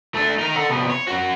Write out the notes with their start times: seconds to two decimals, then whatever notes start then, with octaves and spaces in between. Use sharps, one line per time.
0.14 A3 D4
0.39 D#4 A#4
0.56 A4 F#5
0.70 C3 B3
0.90 C#5
1.07 C#4 F#4